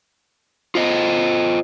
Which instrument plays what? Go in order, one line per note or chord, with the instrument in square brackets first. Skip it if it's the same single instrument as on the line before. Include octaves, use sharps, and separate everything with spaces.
[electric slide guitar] F4 C5 D#5